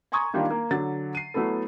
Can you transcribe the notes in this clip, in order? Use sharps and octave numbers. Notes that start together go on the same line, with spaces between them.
G#5 A#5 C6 C#6 D#6 G#6
D#3 G3 A#3 D4 F4
A#3
D3 F#3 A6
C7 D#7
F#3 A3 B3 E4 A4